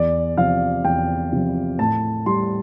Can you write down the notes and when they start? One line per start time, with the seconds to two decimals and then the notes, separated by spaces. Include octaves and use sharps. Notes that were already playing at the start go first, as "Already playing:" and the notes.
Already playing: E2 D5
0.37 C3 F3 F5
0.84 E2 G5
1.32 C3 F3
1.79 A2 A5
2.26 G3 C6